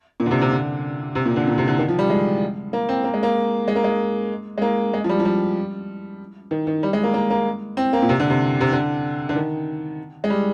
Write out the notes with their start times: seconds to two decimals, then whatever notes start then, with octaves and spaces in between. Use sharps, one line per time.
0.20 A#2
0.26 D3
0.31 C3
0.42 C3
0.52 D3
1.15 C3
1.26 A#2
1.36 D3
1.48 A#2
1.58 C3
1.67 D3
1.78 D#3
1.88 F3
1.99 G3
2.10 G#3
2.73 A#3
2.89 C4
3.04 A#3
3.14 G#3
3.23 A#3
3.68 G#3
3.76 A#3
3.84 G#3
4.58 G#3
4.62 A#3
4.93 G#3
5.04 F3
5.09 G3
5.19 F3
5.25 G3
6.51 D#3
6.67 D#3
6.83 G3
6.93 G#3
7.03 A#3
7.14 A#3
7.30 A#3
7.77 C4
7.93 A#3
8.02 A#2
8.09 C3
8.20 D3
8.30 C3
8.61 C3
8.72 D3
9.29 D3
9.36 D#3
10.24 G#3
10.30 G3